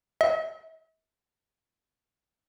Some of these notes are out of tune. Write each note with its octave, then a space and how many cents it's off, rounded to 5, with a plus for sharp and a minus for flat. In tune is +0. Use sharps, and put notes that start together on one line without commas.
E5 -45